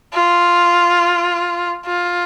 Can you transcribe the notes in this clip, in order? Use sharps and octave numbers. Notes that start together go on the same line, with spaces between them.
F4
F4